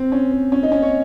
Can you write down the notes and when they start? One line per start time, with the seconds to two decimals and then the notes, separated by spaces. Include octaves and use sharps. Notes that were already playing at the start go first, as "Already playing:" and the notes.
Already playing: C4
0.12 C#4
0.32 C4
0.52 C#4
0.63 D#4
0.72 C#4
0.82 C#5